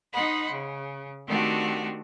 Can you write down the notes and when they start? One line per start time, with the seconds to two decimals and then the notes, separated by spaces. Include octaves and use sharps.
0.12 D#4 C5 D#5 F#5 B5
0.49 C#3
1.26 D#3 A3 C4 D4 F#4 G4